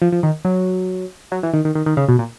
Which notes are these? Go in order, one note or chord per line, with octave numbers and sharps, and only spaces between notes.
F3
F3
D#3
F#3
F#3
E3
D#3
D#3
D#3
D#3
C#3
B2
A#2